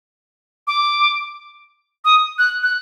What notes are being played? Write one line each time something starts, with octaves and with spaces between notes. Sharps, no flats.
D6
D#6
F#6
F#6